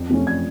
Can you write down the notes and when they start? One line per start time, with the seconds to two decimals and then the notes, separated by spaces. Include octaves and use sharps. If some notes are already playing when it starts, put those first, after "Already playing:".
Already playing: F2
0.09 C3 F3 A3 C#4
0.27 G#6